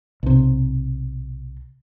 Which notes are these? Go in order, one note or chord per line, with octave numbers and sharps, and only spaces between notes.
B1 C3